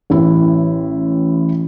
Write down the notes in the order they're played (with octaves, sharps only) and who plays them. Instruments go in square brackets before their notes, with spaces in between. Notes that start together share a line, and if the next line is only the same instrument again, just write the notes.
[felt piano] A1 E4